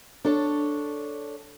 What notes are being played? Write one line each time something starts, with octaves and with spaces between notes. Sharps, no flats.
D4 A4 C#5